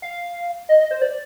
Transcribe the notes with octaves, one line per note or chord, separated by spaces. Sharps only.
F5
D#5
D#5
C5
D5